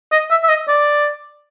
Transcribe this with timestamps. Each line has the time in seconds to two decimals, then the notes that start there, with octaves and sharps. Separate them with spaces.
0.12 D#5
0.30 E5
0.44 E5
0.48 D#5
0.68 D5